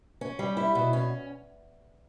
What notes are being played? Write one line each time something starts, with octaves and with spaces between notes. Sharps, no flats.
C#4
G3
E4
B2
C#4